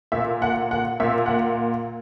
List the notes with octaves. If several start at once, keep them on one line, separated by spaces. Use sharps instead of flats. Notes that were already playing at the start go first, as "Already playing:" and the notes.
A#2 E5
F#5
F#5
A#2 E5
F#5